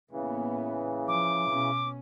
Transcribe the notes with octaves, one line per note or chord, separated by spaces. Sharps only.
A2 C#3 E3 A#3 B3
F3 D6
B2 C#4